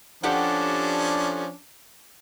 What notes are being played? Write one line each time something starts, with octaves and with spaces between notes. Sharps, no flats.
F3 C#4 D4 G4 A4 F#5